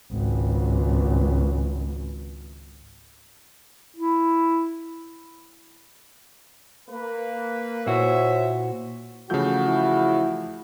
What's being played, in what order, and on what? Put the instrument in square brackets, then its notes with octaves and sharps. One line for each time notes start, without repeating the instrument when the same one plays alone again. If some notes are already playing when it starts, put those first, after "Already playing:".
[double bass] G#1 C#2
[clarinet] E4
[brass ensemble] A#3 B4
[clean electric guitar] A#2 E4 F#4 [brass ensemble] C5 C#5 E5
[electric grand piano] C#3 G6 [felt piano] E3 F3 A3 [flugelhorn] F#4
[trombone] E4